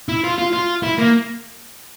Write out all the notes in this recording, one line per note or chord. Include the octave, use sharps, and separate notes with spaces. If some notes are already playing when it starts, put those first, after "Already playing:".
E4
F4
F4
F4
E4
A#3